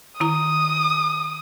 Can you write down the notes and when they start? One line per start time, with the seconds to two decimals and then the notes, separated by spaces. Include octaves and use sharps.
0.20 D#3 E4 A#5 D#6